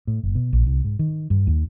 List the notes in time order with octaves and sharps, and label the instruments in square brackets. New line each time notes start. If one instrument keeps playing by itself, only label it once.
[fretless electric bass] A2
F#1
B2
A#1
C2
G#2
D#3
G2
D#2